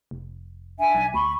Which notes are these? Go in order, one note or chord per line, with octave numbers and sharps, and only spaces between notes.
F1
D4 E5 G#5
B1
D2 B5 C#6